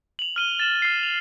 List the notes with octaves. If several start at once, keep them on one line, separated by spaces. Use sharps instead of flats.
F7 F#7
F6 D#7 G7
A6 E7 F#7
F6 C7
F7